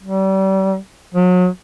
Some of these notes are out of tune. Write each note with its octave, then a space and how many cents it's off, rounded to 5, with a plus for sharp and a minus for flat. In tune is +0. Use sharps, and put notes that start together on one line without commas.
G3 -35
F#3 -35